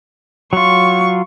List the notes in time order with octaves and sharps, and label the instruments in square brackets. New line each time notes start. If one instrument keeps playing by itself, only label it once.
[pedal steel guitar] F#3 F4 [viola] C#6